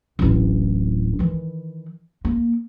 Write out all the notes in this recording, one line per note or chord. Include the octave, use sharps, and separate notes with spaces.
D1 A1
D#3 E3
A#3